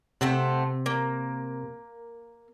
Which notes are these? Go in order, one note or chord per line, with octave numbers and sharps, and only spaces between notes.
C3 A3 C4 F#5
A#3